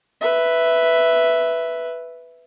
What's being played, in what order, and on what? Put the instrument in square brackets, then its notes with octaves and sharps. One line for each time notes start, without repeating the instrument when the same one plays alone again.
[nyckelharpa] B4 E5